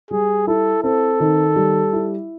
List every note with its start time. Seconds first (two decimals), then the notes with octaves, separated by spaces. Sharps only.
0.11 G3 G#4
0.47 E4 A4
0.83 C4 A4
1.20 D#3
1.56 G3
1.93 E4